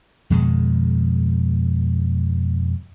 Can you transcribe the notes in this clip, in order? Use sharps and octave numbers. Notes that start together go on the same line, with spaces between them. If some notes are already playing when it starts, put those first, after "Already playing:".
F2 B2 D#3 G#3